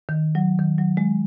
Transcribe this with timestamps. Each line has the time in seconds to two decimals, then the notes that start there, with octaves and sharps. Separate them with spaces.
0.09 D#3
0.35 F#3
0.59 D#3
0.78 F#3
0.97 G#3